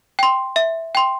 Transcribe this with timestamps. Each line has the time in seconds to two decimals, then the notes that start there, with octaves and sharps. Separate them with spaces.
0.19 G5 C6
0.56 E5
0.95 G5 C6